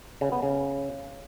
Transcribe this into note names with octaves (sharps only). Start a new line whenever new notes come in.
C#3
B3
C#3